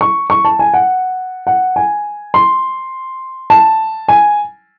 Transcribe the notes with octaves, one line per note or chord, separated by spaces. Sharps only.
C#6
C#6
A5
G#5
F#5
F#5
G#5
C6
A5
G#5